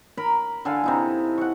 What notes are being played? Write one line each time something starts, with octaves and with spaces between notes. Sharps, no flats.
A#4 A#5 B5
D3 A4 F5 G#5
C3 D#4 E4
F#5 C#6